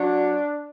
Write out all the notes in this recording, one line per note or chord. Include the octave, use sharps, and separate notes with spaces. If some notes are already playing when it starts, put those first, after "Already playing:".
Already playing: F#3 D4